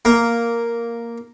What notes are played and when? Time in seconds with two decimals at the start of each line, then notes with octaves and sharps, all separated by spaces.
0.05 A#3